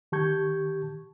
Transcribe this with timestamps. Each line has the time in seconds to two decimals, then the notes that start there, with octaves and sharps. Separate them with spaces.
0.12 D#3 G4 A5 C#6 G6 G#6